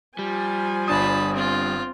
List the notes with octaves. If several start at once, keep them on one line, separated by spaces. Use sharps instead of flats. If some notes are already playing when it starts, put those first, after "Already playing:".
F3 G3 G#5
G1 D4 A5 B5 D#6
C4 F4